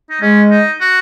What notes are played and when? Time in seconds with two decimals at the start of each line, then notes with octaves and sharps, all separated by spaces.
0.10 D#4
0.21 G#3 C#4
0.51 D#4
0.80 F#4